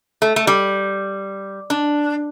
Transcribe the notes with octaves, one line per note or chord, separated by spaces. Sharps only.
A3
A3
G3
D4